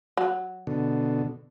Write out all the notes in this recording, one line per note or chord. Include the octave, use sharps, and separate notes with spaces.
F#3
B2 D3